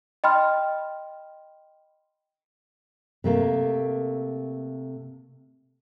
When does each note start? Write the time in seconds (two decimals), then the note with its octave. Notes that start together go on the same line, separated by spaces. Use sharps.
0.24 D#5 G5 B5 C6 F6
3.24 C3 A3 A#3